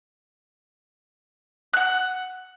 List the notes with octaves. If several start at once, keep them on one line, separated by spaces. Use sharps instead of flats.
F#5 F#6